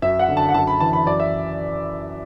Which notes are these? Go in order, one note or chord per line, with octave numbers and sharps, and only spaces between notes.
F#2 E5
F#5
D3
A5
F#5
F#2 A5
B5
E3 A5
B5
F#2 D5
E5